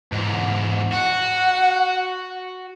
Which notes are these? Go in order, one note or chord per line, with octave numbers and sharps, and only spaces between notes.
E2 G#2
F#4 F#5